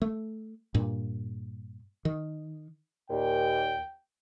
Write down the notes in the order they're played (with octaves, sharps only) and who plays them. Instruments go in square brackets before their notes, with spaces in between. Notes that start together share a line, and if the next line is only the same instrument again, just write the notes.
[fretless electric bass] A3
G2 A#2
D#3
[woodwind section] D#2 A#2 [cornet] G5